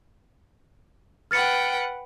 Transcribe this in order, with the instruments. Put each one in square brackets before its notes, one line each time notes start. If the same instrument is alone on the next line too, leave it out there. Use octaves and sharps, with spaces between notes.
[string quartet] B4 F#5 G5 [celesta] F6 A6 C#7